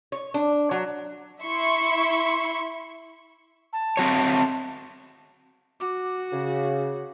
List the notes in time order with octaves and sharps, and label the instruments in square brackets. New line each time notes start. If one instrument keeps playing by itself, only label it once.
[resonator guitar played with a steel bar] C#5
D4
F#3
[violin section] E4 E5 C6 C#6
[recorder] A5
[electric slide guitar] C4 F#4 C#5
[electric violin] F#4 [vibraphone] D6
[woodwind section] C#3